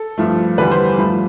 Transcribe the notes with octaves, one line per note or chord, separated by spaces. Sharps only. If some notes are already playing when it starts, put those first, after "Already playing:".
Already playing: A4
G2 F3 A3
E2 D3 G3 B4
C5
G2 F3 A3 B5